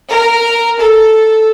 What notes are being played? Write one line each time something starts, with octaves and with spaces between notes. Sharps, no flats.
A#4
A4